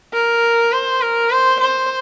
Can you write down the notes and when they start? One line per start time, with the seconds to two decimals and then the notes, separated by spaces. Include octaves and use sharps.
0.13 A#4
0.73 C5
1.01 A#4
1.31 C5
1.60 C5